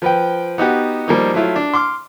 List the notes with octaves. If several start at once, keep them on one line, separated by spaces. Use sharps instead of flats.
F3 B4 G5
B3 D#4 F#4 G4
F3 G3 A#3 D#4
F#3 A3 E4 F4
D4
C6 D6 F6